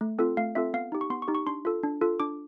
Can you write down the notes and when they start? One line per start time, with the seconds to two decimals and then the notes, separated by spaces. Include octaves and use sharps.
0.01 A3
0.18 C4 F4 A4
0.37 A3 F5
0.55 C4 F4 A4 E5
0.74 B3 F5
0.92 D#4 G4
1.01 C#6
1.10 B3 C6
1.22 C#6
1.28 D#4 G4
1.35 C#6
1.47 D4 C6
1.65 F4 A4
1.83 D4
2.01 F4 A4
2.20 D4 D6